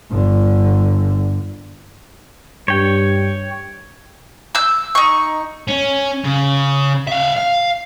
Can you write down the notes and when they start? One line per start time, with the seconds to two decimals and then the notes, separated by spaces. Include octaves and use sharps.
0.11 G1 D3
2.68 G2 C#5 G5
4.55 E6 G6
4.95 D#4 C#6
5.68 C#4
6.25 C#3
7.07 E5 F5
7.37 F5